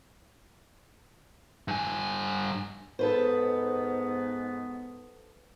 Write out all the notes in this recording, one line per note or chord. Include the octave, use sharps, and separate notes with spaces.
G2 G#5
G#2 B3 A4 B4 C5